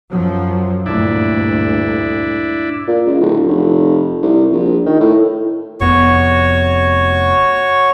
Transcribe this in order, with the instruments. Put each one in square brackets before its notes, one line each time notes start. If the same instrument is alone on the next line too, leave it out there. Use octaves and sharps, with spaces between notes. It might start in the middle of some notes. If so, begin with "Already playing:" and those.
[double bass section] F#2 F3 F#3
[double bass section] D2 G2 A#2 [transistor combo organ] D4 E4
[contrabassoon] A#2
C#2
D1
F1
C2
A#1
D#3
A2
[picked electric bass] F1 F2 B3 [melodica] F#4 C#5 C#6